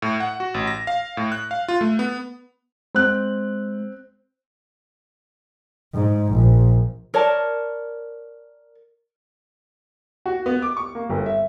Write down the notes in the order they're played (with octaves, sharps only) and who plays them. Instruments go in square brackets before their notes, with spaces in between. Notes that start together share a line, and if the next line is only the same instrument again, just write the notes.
[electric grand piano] A2
F#5
F#4
A1
A#6
F5
A2
F#6
F5
F4
A3
B3
[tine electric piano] G#3 [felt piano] C4 F#6
[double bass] G#2
A#1
[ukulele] A#4 C#5 D5 A5
[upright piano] F#4
B3
D6
C#6
A#3
G1
E5